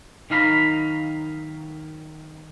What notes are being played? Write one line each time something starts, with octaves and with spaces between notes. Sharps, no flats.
D#3 F#3 D#4 F5 A#5 B5